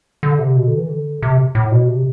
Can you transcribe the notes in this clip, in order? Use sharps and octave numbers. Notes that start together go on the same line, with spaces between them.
D3
C3
B2
D3
E3
D3
C3
A2
B2
C3